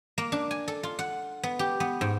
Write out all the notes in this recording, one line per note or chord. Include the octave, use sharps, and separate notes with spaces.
A#3
D4
G#5
A4
F4
F#5
B3
G4
B3
G#2